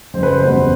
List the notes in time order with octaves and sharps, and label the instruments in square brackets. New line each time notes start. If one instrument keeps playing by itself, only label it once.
[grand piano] F#1 C5
B4
C5
E2 B2 G3 B3